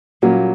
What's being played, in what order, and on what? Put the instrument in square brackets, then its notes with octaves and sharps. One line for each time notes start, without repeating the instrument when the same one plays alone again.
[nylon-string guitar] A#2 G3 A#3 C#4 F4 [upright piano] F#3